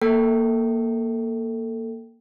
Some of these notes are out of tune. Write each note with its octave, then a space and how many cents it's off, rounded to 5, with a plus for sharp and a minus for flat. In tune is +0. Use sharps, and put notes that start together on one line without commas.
A#3 +0 A4 +15 G5 -10